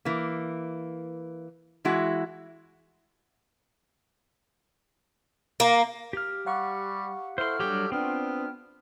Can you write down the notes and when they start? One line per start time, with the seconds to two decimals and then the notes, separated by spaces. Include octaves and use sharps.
0.05 E3 A#3
1.85 E3 G#3 E4 F#4
5.60 A#3
6.13 G4 F6
6.46 G3 F5 F#5 C#6
7.38 E4 A4 C5 C6 F6
7.60 F#3 G3 D4 G4
7.92 B3 C4 D4 F4 G5 F6